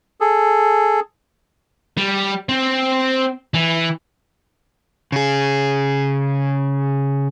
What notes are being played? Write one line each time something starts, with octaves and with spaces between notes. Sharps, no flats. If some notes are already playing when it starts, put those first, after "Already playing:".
G#4 A4
G3
C4
E3
C#3 G#4